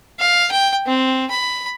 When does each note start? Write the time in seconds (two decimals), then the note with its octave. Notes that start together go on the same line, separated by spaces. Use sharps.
0.19 F5
0.51 G5
0.86 C4
1.30 B5